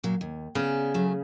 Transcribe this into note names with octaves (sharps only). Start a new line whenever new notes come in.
A#2 F#3 F5
D#2
C#3 B3 D5
F#3 A3